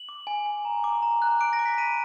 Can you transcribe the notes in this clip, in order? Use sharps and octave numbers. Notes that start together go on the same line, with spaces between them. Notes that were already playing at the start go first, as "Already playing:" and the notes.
Already playing: F#7
D6
G#5
G#5
A#5
D6
A#5
F#6
D6 D7
A#6
D6
B6
B5 D#7